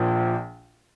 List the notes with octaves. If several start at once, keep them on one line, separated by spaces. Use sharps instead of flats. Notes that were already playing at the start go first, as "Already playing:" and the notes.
Already playing: A#1 A#2 F3